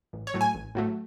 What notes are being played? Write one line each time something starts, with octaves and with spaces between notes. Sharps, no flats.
A1
C#5
A2 F#3 A3
G#5
A1
A2 F#3 A3